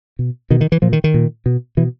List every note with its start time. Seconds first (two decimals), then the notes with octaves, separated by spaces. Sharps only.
0.19 B2
0.50 B2 D#3
0.61 D#3
0.72 E3
0.82 A#2 F3
0.93 D#3
1.04 D#3
1.14 A#2
1.46 B2
1.77 B2 E3